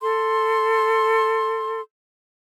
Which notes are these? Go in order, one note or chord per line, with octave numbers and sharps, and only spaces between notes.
A4 C6